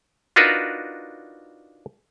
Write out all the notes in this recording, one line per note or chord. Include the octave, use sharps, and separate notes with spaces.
D4 D#4 F4 F#4 A#4 B4